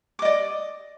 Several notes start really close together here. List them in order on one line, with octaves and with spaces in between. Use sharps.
D6 D#5 D5